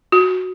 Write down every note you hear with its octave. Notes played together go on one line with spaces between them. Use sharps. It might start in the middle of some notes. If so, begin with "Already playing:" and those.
F#4